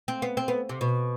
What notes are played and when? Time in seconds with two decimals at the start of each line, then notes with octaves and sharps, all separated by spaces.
0.08 C4
0.22 B3
0.37 C4
0.48 B3
0.69 C3
0.81 B2